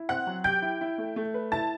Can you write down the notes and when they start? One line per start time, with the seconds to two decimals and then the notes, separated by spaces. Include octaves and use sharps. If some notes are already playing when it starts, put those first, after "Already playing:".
Already playing: E4
0.09 C4 F#5 F#6
0.27 F#3
0.44 G4 G5 G6
0.62 E4
0.81 E4
0.98 A3
1.16 A3
1.34 B4
1.52 E4 A5 A6